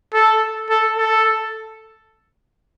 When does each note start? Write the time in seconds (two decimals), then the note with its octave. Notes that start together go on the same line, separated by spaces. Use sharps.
0.13 A4
0.70 A4
0.98 A4